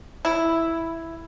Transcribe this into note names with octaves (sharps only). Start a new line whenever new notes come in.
E4